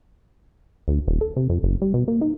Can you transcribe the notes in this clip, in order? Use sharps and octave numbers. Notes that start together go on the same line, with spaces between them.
D2
D#1
A4
C3
F2
F#1
G3
B2
A#3
D#4